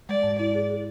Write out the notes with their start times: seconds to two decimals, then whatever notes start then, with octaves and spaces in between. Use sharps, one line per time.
0.09 G#3 D5
0.23 G#2
0.39 E4 D5
0.55 G#4
0.70 G#4